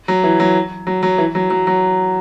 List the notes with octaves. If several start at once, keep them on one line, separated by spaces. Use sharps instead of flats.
F#3
E3
F#3
F#3
F#3
E3
F#3
F#3
F#3